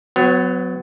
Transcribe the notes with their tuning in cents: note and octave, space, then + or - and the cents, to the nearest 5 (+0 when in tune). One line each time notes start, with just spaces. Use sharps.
F#3 -15 B3 +25